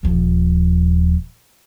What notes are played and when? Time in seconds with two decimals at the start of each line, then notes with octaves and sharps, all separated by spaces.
0.03 D#1 F3